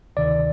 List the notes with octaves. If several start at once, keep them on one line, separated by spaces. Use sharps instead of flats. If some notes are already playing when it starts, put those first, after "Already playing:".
D2 C3 D#3 D5